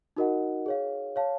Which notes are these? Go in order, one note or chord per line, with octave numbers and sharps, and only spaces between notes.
D#4 F#4 A#4 D#5 F#5
G#4 C#5 F5
C#5 F5 A5